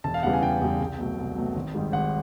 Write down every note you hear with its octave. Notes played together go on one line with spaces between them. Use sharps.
E1 A5
F5
E2 C#3 E3 G3 F#5
G#5
E1 G5
E2 C#3 E3 G3
C2
B2 F#3 A3
C2
B2 F#3 A3
G#1
G#2 D#3 G3
G#1 F#5